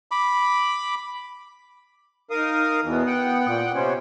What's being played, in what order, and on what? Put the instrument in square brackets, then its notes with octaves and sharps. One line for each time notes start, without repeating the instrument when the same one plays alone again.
[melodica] B5 D6
[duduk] D#4 [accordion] A#4 F5 D#6
[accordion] E2 B2 E3 [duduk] B3
[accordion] F#5 G5
[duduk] A#2
[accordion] C3 B3 C#4 [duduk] C5